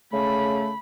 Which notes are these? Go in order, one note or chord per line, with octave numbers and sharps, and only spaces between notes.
C#3 A3 B5